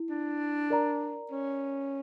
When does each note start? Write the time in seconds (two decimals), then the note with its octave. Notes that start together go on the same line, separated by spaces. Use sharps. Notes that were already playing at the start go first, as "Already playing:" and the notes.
Already playing: E4
0.09 D4
0.70 A#4 D5 A#5
1.31 C#4